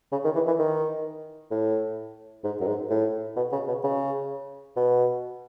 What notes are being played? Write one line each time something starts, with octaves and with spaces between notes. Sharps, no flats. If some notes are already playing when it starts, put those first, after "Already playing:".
C#3
D#3
E3
E3
D#3
A2
G#2
F#2
G#2
A2
B2
C#3
B2
C#3
B2